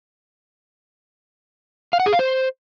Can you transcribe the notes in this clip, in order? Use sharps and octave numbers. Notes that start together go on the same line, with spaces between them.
F5
F#5
G#4
F5
C5